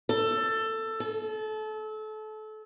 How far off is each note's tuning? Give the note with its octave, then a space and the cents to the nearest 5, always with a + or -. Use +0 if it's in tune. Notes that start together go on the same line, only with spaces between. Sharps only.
A4 +15
A4 -30